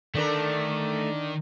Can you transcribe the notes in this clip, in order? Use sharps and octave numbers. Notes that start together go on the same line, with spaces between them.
D3 D#3 A3 D4 A#4